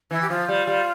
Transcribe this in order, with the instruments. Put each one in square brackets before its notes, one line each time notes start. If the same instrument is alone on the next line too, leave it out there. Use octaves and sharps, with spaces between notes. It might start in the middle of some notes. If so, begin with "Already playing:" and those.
[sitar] E3 [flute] E4
[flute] G4
[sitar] F3 [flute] F4
[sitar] G3
G3